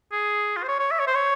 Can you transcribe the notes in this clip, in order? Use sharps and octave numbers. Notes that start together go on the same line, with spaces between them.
G#4
F4
C5
C#5
C#5
E5
C#5
C5
C#5